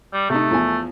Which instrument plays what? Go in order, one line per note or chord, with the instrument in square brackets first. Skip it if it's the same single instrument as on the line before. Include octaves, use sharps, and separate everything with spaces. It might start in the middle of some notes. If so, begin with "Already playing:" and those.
[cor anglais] G3
[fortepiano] C3 D#4 [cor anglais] A3
[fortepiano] E2 F3 G#5